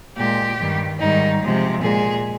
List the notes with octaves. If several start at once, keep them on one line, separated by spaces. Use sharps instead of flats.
A#2 G#3 G4
G2 D#3 G3
G#2 D#3 G3 D#4
C3 F3 G#3
A#2 G#3 G#4